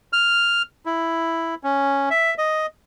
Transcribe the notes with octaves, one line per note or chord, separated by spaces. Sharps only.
F6
E4
C#4
E5
D#5